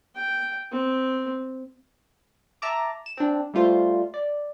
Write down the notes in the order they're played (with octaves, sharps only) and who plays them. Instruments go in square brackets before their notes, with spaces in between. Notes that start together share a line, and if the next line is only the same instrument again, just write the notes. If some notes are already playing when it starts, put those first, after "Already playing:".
[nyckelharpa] G5
C4
[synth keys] E5 A5 A#5 D6
E7
C4 D4
G3 A3 F4 C5
D5